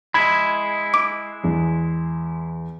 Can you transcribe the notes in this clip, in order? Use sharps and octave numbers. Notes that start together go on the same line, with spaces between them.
G#3 E4 B5 G#6
D6 D7
E2